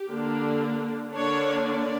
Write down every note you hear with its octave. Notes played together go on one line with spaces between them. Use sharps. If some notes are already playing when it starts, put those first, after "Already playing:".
Already playing: G4
D3 A#3 D4
D3 A#3 D4 C#5
D5